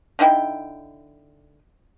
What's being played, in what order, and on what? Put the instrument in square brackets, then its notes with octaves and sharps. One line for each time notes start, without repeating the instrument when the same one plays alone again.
[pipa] D3 D#4 E4 G5